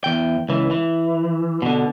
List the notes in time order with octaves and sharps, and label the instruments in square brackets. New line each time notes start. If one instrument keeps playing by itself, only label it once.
[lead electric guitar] E2 G5
C#2 E3
E3
B2 D3